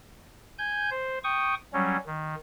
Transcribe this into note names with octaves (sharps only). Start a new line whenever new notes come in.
G#5 G6
C5
G5 C#6 D#6
F#3 G3 C#4
D#3